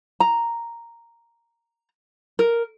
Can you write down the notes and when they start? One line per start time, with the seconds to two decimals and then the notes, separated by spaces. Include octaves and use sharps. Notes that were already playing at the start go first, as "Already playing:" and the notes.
0.20 A#5
2.39 A#4